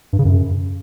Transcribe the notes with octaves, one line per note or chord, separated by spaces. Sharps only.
G2
C#3
F#2